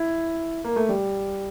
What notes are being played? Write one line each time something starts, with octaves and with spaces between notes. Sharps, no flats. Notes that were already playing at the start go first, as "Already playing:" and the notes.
Already playing: E4
A#3
A3
G3